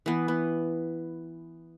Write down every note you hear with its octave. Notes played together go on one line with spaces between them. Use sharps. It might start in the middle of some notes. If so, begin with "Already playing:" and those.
E3 B3
B3